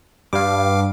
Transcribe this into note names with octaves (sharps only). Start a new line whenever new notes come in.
G2 F5 D6